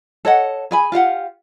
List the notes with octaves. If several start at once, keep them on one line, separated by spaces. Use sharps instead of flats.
A4 C#5 D#5 F#5
G#4 G#5 B5
F4 G4 F5 F#5